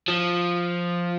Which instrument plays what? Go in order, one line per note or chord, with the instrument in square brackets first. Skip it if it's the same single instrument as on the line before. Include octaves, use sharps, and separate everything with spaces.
[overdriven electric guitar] F3